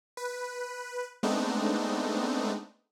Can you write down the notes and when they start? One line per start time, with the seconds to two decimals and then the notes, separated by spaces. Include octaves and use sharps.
0.17 B4
1.23 G#3 A3 B3 C4 D4 D#4